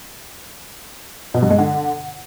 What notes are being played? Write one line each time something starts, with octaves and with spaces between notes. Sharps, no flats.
B2
G2
G#3
D3